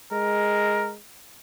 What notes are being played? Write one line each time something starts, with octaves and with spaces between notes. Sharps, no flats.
G#3 A#4